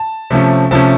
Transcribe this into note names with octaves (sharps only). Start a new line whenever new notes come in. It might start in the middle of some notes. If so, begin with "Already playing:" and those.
Already playing: A5
C3 F3 A3 C#4
C3 F3 A3 C#4 A5